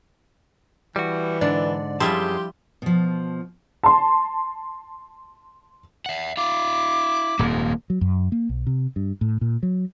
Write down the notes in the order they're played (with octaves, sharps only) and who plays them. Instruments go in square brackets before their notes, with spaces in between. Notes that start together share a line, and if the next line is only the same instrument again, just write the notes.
[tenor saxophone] E3 [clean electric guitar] G3 F#4
[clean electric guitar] G#2 D3 [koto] D4 [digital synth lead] D5
[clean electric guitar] F#2 G#4 A5 [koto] F3 G3 E4 [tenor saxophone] G4 [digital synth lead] C6
[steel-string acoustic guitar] B2 F3
[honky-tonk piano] A5 C6
[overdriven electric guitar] E5 F#5
[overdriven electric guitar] E4 F5 [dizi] D6
[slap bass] D#1 F2 G#2 [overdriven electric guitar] A#3
[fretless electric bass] F#3
F#2
A#3
B1
C3
G2
A2
A#2
F#3